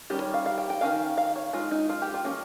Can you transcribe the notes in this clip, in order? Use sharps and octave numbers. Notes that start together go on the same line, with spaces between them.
D#3 G3 C#4 G4
C#5
F5
F5
G5
G5
D#3 G#3 C#4 F5
F5
C#5
G#3 D#4 F4
D#4
F4
G4
F4
F3 A#3 C#4